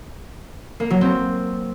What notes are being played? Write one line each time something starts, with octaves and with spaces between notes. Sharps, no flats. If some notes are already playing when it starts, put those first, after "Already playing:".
A#3
F#3
C4